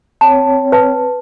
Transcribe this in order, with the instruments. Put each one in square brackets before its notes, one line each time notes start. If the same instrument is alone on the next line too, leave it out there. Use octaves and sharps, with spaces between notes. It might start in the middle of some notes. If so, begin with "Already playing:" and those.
[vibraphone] C4 C#5 G5 [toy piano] A5
[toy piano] B4 A5